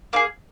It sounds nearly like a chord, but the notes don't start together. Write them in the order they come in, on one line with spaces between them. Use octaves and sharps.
A#3 D#4 G#4